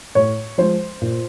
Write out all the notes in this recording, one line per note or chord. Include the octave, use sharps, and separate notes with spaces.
A2 C#5
F3 G#3 C5
A#2